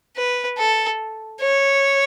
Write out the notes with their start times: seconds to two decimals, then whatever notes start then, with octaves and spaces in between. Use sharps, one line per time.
0.16 B4
0.58 A4
1.42 C#5